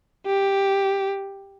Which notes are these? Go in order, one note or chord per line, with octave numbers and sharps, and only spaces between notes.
G4